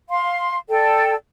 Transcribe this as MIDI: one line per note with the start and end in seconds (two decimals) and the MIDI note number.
0.09 0.57 77
0.09 0.57 84
0.69 1.14 69
0.69 1.14 74
0.69 1.14 79